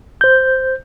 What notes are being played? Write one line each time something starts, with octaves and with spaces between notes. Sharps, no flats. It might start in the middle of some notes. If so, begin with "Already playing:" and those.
C5 G6